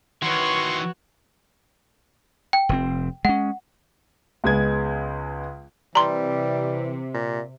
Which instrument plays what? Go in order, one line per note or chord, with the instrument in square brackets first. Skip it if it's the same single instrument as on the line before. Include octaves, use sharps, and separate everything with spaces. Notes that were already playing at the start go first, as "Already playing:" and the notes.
[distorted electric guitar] D#3 E3 [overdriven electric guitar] F#4 [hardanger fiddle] B4 C#5 [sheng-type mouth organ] C6 C#6
[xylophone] G5
[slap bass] F1 G#2 C4
[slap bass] G#3 C#4 [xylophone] F#5
[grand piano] C#2 G#3 B3 G#6
[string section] C3 [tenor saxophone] E3 [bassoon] G3 [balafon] A#5 C6
[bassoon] A#2